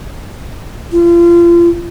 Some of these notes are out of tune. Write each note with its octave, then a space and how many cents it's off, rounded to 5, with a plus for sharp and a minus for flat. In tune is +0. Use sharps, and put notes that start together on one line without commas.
F4 -35